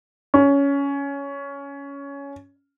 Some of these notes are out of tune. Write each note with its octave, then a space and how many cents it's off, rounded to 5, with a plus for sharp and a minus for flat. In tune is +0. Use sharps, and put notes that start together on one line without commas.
C#4 +15